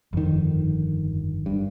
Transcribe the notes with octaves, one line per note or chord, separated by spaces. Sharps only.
G1 F2 D#3
G2